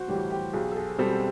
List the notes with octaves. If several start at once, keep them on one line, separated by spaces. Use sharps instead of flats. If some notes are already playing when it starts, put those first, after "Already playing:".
Already playing: B1 F#4 C5
A2 E3 G3 G4
G4
B1 G#4
A4
G#4
B2 G3 C4 A4